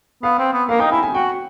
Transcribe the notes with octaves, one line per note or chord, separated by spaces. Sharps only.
B3 F5
C4
B3
A#3 F5
D#4 G5
E4 G#5
G#5
F#4 G5